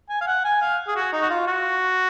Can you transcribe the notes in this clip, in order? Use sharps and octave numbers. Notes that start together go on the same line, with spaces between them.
G#5
F5
F#5
G#5
F5
G#4
F#4
D#4
F#4
F4
F#4